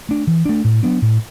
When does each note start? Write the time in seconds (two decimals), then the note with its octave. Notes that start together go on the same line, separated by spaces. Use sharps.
0.09 A3 D4
0.27 E3
0.45 A3 D4
0.64 A2
0.83 F#3 B3 D4
1.02 A2